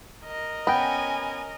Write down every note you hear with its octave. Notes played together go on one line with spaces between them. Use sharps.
A#4 D#5
B3 C#4 G5 G#5 B5